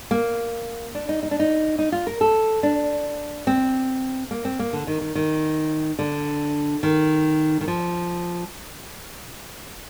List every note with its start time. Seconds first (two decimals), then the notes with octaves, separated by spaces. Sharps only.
0.11 A#3
0.95 D4
1.09 D#4
1.23 D#4
1.31 D4
1.40 D#4
1.79 D#4
1.92 F4
2.07 A#4
2.21 A4
2.63 D4
3.47 C4
4.31 A#3
4.45 C4
4.59 A#3
4.73 D3
4.87 D#3
5.01 D#3
5.15 D#3
5.99 D3
6.83 D#3
7.61 D#3
7.68 F3